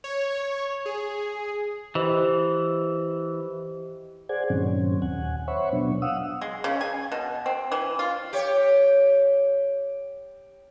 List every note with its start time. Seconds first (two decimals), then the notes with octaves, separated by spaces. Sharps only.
0.04 C#5
0.86 G#4
1.95 E3 G4 C5 D#5
4.29 G#4 C5 D5 F#5 G#5 G#6
4.50 G2 A#2 D#3 F#3 C4 C#4
5.02 D#2 F#5 G#5
5.48 C5 C#5 E5 F#5 B5 C#6
5.73 B2 F#3 B3 D4
6.02 F5 F#5 D#6 E6
6.41 G#3
6.64 C#3
6.81 G#5
7.12 B2
7.46 C4
7.72 E3
7.99 F4
8.33 G4 C#5